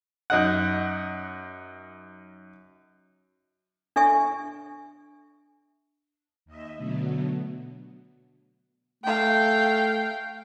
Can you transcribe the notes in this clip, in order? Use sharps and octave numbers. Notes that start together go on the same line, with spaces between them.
F#2 D#4 F#5
D4 A4 E5 G#5 C#6
D#2 D#5 E5
B2 D3 F#3 A3 B3
A3 F5 G5